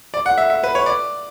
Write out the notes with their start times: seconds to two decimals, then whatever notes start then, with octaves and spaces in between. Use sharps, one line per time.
0.14 D5
0.26 F#5
0.38 E5
0.50 E5
0.64 B4
0.75 C#5
0.86 D5